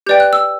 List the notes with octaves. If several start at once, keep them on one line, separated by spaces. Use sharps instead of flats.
G4 B4 D5 G5 G6
F#6
E6